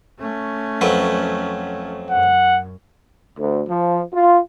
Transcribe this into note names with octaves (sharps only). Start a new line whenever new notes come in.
A3 C#4
F2 F#3 B4
F#2 F#5
D2
F3
F4